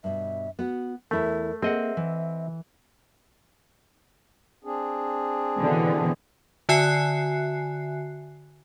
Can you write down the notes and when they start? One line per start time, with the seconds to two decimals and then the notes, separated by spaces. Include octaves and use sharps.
0.04 G2 B2 E5
0.59 B3 F#4 F#5
1.11 E2 A3 E4 A#4 B4
1.62 A#3 C4 G#4 A4 D#5 E5 F#5
1.97 E3
4.64 C4 D4 G#4
5.58 B2 D3 E3
6.69 D3 F#4 E5 G#5 F#6 C7